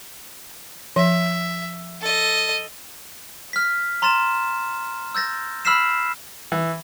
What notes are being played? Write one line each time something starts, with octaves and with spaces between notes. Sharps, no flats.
F3 E5
A4 D#5
F6 B6
A#5 C6 F6 A6 E7
E6 G6 A6 A#6
B5 E6 F6 B6 C7 E7
E3